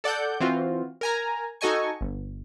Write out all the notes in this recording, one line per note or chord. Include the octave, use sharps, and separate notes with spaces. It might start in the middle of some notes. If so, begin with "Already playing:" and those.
A4 D5 F#5 G6
E3 C4 F4 F#4
A#4 G#5 A#5
D#4 F#4 A4 D#5 G#5 C#6
G1